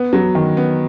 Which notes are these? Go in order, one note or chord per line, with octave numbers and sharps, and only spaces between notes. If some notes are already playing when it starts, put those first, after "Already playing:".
Already playing: B3
F#3
D#3
B3